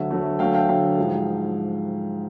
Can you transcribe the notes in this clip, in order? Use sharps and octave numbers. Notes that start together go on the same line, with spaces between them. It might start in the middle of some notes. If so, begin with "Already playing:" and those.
Already playing: D2 D3 F#3 A3 E5 F#5
D2 D3 F#3 A3
D2 D3 F#3 A3 F5 G5
F5 G5
D2 D3 F#3 A3 F5 G5
G#2 F3 G#3